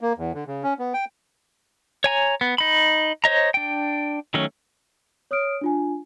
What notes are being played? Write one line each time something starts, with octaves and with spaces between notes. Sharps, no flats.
A#3
E2
D3
C#3
C#4
B3
G5
C#5 G#5 A#5
B3
D#4 B5
C5 C#5 D#5 A#5
D4 G5
D#3 F#3 A3 C#4
C#5 D#6 F6 D7
D4 F4 G#5